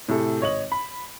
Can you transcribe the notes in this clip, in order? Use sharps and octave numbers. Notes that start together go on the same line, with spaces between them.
A2 C3 G#4 A4
G#1 C#5 D#5 F#7
B5